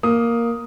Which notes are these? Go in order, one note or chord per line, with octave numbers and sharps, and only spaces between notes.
A#3 D#6